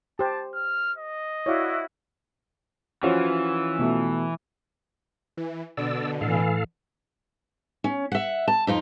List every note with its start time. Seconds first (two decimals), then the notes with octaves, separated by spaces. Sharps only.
0.19 G4 C5 A5
0.54 F6
0.98 D#5
1.46 E4 F#4 C#5 D5 F5
3.03 E3 F3 C#4 F4 F#4 C5 C#5
3.79 B2 A3
5.37 E3
5.77 B2 D3 D5 E6
6.21 A2 E3 A4 F5
7.84 C#4
8.12 E5 F#5
8.48 A5
8.67 F2 D#4 F4